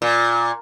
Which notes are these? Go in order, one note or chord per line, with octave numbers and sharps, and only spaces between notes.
A#2